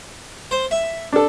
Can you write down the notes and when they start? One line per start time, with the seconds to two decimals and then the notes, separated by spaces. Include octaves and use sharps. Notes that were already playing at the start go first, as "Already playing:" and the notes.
0.51 C5
0.71 E5
1.12 D4 A4